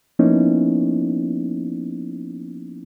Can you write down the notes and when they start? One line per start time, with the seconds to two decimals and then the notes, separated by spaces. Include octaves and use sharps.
0.19 F3 A#3 B3 C#4 D#4 E4